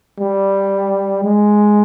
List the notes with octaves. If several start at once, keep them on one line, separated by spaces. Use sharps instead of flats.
G3
G#3